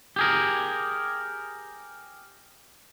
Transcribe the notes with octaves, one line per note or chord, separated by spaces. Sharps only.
G4 G#4 A#4